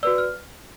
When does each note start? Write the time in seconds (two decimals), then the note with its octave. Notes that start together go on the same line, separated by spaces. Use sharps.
0.03 F#4 B4 D5 E6
0.18 F6